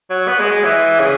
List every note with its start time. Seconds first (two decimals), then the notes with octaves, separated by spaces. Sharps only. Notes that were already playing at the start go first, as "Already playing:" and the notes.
0.10 F#3
0.28 B3
0.39 G#3
0.51 G#3
0.64 E3
1.00 C#3